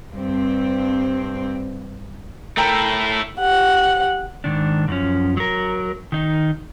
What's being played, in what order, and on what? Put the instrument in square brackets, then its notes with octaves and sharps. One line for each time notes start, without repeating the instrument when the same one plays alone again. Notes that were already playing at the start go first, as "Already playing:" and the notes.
[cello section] G2 C4
[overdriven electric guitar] A3 E4 [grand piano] A#4 G5
[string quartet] G4 F#5
[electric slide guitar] G#2 D#3 D4
F#2 F3 C#4
F#3 A#4
D#3 D#4